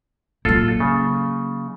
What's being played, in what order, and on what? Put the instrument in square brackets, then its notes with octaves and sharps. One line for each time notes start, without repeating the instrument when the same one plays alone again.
[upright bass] F#3 A#3 [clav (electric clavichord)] F4 A4
[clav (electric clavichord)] C#3